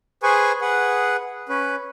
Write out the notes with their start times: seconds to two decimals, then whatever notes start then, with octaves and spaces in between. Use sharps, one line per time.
0.23 G#4 B4 C5 G#5 C#6
0.61 G#4 B4 F#5
1.49 C#4 B4